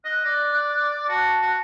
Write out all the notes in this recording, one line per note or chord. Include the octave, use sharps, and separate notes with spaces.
D#5 F#6
D5
F#4 A5
F#4